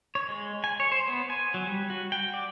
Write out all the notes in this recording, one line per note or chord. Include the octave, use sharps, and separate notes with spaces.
C#5
G#3
G#5
C#5
C5
B3
G#5
F#3
G3
F#4
G5
D5